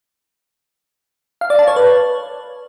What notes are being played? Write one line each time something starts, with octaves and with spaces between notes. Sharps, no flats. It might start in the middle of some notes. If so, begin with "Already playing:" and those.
F5
D5
A5
C#5
B4